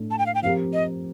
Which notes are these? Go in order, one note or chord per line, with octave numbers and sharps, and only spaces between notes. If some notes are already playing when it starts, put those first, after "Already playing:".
Already playing: A2 A3 D4 A4
A5
G5
F5
G5
F3 C4 G4 A#4 F5
D#5